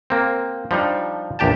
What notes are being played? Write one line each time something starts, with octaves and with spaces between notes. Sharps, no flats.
A#3 C4
F3 G3 D4 D#4
A#1 E2 G4 G5 A5